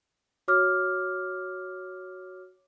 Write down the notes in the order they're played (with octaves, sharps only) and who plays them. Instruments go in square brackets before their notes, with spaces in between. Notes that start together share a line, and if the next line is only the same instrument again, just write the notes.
[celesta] F#4 C#5 D6 F6